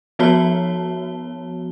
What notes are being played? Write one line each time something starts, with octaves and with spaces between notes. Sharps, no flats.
F3 B3 F#4 C#5 A5 G7